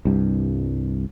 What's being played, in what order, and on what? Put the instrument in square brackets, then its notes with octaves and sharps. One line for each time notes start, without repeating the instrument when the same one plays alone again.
[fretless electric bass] C2 G2